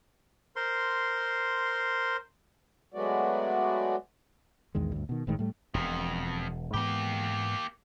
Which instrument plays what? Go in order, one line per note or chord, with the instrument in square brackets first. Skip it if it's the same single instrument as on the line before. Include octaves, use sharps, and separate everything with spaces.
[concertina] A#4 C5 C6
[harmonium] F#3 G#3 A3 B3 F#4 D5
[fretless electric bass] A#1 E2 D#3 G#3
D2 G2
B2 D#3
G1 A2 D#3 G#3
A2 G3 A3
[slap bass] E1 B2 [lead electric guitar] F2
[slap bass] G#2 E3 B3 [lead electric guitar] A#3 G4